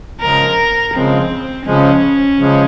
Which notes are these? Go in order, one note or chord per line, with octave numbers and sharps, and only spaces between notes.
C#3 F3 G#3 A#4
C#3 F3 G#3 C4
C#3 F3 G#3 C#4
C#3 F3 G#3